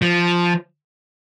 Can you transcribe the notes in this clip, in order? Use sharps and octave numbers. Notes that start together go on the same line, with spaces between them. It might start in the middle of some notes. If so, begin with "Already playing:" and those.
F3